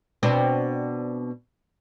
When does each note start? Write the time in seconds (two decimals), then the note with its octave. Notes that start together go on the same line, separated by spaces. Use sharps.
0.23 B2 C4 D4